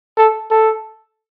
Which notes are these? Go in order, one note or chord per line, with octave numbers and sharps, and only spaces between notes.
A4
A4